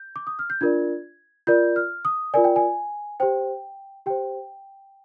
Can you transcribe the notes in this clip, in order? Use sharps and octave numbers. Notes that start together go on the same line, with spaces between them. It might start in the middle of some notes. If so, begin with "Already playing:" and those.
Already playing: G6
D6
D#6
F6
G6
D4 F4 A#4 D5 G#6
F4 A#4 D5 G6
F6
D#6
F4 A#4 D5 G#5
G5
G#5
G4 C5 G5
G4 C5 G5